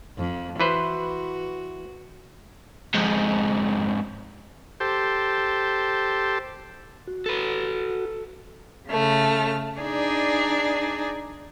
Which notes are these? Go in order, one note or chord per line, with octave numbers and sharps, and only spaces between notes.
F2
E3 F#4 B4 C5
F2 G#2
G4 A4 C5
F#4
A4 B4
C#3 A3 F6
D4 D#4 G#4 D5